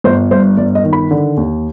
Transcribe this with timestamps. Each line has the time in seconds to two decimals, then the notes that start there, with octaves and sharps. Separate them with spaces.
0.04 G1 C5
0.31 G2 C5
0.57 G1 D5
0.75 D#5
0.84 D#3
0.93 B5
1.11 D3
1.37 D#2